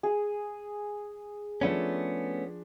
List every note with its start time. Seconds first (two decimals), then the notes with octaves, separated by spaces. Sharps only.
0.03 G#4
1.61 F3 A3 B3 C#4 D4